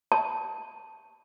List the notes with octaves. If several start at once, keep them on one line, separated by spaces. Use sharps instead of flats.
A5